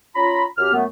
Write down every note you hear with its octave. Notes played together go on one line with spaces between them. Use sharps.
C#4 F4 A#5 B5
F#2 G4 F6
F#2 A3 B3